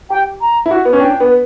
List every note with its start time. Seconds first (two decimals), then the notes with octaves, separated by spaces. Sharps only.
0.10 G4 G5
0.41 A#5
0.66 E4
0.71 F#4
0.85 B3
0.93 C#4
0.99 D4 G5
1.10 D4
1.20 B3